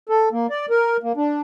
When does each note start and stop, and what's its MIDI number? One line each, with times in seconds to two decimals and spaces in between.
0.09 0.29 69
0.32 0.47 58
0.50 0.66 74
0.70 0.97 70
1.03 1.12 58
1.17 1.41 62